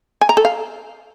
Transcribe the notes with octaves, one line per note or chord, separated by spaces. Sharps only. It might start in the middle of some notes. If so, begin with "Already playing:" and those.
G#5
A#5
A4
F5